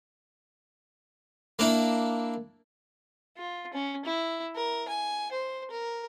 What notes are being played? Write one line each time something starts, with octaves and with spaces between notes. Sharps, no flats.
A#3 D4 E4
F4
C#4
E4
A#4
G#5
C5
A#4